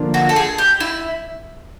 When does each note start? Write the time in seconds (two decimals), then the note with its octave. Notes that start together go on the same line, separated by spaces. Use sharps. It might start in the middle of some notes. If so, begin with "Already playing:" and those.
Already playing: D3 F3 A#3 D4 F4
0.14 F#4
0.29 A4
0.36 G#4
0.58 G4
0.80 E4